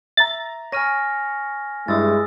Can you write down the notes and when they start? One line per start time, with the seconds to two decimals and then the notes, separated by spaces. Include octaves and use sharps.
0.17 E5 A#5 A6
0.72 C#5 G#5 C#6 F6 A#6 D#7
1.88 G2 G#3 E4 D#6 E6 A6